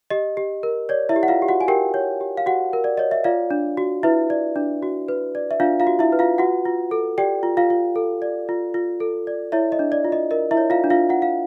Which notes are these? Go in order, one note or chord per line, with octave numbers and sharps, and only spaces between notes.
G4 D#5
G4
A#4
C#5 D5
E4 E5
G4
F#5
F4 F5
G4
F#4 F#5
G#5
G4 A#4 G5
C#5
G4
F5
F#4 G4 F#5
A#4
D5
C#5 D#5
E5
F4 D5 F5
D4
F#4
E4 B4 E5
D5
D4
F#4
B4
D5
E5
D4 F4 F5
F4 F5
F#4
E4 E5
B4
F4 F5
F4 F#4 F#5
F4
A4
G4 D5 G5
F4
F4 F5
F4
A4
D5
F4
F4
A4
D5
E4 C#5 E5
D#5
D4
D5
F4
D#5
A#4 D#5
E4 E5
C#5
F4 F5
D4
F4 F5
F4 F#5
F5